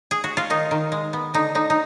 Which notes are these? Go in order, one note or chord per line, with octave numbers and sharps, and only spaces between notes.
G#4
F#4
F4
D#3 D#4
D#3
G#3
B3
D3 D#4
D3 D#4
D#4